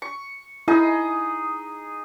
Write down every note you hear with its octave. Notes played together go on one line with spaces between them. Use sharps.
C#6
D#4 E4 G#4 D#5